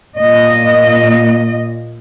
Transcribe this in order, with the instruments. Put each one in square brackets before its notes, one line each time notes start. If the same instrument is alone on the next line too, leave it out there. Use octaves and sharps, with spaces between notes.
[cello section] A#2 D#5